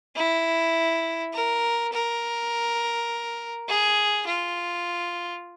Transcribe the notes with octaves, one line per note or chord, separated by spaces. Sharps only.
E4
A#4
A#4
G#4
F4